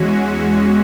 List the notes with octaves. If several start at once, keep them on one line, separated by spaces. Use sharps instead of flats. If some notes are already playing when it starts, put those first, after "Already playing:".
Already playing: E2 E3 G#3 C#4 F#4